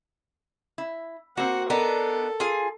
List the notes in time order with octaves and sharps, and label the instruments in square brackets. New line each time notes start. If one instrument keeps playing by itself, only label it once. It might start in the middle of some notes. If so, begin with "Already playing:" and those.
[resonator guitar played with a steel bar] E4
[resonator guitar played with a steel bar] A#3 C4 [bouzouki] F#4 [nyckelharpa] F#5
[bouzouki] B3 D4 D#4 [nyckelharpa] A4 [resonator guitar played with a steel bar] A#4
[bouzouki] F4 G#4 G#5